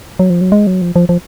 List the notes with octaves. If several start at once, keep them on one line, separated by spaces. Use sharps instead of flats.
F#3
F3
F#3
G#3
F#3
F3
F3
F3